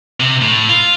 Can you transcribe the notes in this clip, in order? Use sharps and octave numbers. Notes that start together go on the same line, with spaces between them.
C3
A2
F4